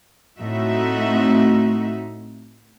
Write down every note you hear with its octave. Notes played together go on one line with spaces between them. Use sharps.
A2 A3 C4 D#4 F#4 E5